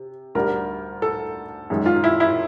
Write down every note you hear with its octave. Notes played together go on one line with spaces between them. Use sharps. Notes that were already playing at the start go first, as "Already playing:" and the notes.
Already playing: C3
D2 D3 G3 A#4
A4
F#2 D#3 G#3
F4
E4
E4